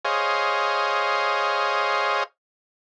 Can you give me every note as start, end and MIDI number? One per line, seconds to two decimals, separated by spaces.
0.05 2.24 68
0.05 2.24 72
0.05 2.24 73
0.05 2.24 75
0.05 2.24 77